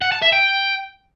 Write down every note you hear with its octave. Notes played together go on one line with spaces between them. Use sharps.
F#5
A5
E5
G5